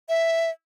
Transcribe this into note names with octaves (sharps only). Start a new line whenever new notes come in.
E5